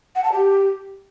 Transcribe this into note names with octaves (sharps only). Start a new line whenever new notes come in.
F#5
A5
G4